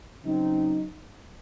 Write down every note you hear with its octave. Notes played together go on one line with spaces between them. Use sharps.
C#3 F#3 C4 D#4